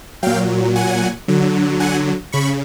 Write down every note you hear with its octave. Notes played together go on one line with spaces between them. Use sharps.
A#2 F#3 F5 G5
F#5 G#5
D3 F#3
F#5 G#5
C#3 B5 C#6